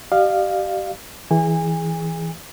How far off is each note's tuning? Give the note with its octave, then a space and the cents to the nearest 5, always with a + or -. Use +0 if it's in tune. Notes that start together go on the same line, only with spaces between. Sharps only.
G4 -35 D5 +45 F5 +0
E3 -10 G#4 +0 G#5 -30